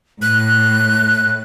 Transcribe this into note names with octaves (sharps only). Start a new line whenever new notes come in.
A2 F#6